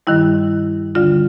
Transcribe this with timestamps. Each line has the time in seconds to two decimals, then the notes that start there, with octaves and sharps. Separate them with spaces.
0.07 G2 D#3 G3 E4
0.95 D2 D3 G3 F4